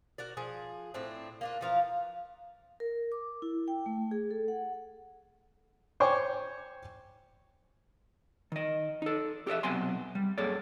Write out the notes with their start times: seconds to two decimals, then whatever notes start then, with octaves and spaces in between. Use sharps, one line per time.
0.18 F#4 A#4 D5
0.37 F3 G#4
0.94 A2 A3 C4 D4
1.41 A#3 D4 F4
1.61 E3 F3 F5 A#5
2.80 A#4
3.12 D6
3.42 E4
3.68 G5
3.86 A3
4.11 G#4
4.31 A4
4.48 F#5
6.00 C5 C#5 G5 G#5 C#6 D6
8.52 D#3 D#5
9.02 D#4 A4
9.47 G4 A4 D5 E5
9.63 B1 C3 F#3 B3 G#5 C6
10.15 G3
10.38 F#2 A#3 G#4 A4 C#5 D5